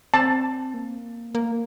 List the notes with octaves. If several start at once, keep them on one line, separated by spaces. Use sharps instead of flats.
C4 A5
A#3
A#3